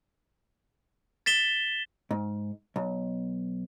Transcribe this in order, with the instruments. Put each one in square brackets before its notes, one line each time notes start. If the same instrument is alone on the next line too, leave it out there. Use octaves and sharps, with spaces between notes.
[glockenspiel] A6 B6 E7 G7
[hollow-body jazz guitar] G#2
B1